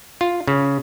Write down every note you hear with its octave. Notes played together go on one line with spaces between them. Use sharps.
F4
C#3